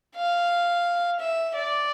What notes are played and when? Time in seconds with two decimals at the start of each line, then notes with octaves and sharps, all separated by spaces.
0.16 F5
1.20 E5
1.55 D5